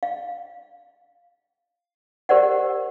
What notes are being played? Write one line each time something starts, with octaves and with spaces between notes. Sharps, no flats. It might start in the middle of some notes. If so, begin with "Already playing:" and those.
F5
G4 A#4 C5 D5 F#5